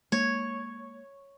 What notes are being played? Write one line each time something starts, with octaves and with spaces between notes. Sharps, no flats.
G#3 A#3 C#5